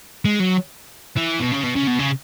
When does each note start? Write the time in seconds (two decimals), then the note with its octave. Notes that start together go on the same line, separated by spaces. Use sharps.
0.25 G#3
0.40 F#3
1.16 E3
1.39 B2
1.52 C#3
1.63 B2
1.75 C#3
1.87 B2
1.99 C#3